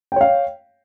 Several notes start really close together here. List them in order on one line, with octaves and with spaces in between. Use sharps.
G5 C#5 F5